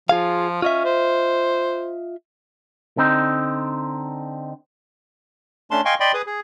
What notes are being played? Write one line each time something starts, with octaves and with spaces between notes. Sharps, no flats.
F3 F4 G#4 F5
C#4 F4 D#5 E5
C5
D3 C4 D#4
A3 C#4 D4 A5 C6
D#5 F5 G5 G#5 C6 C#6
D5 D#5 G5 B5 C6
G#4 B4 D#6
G#4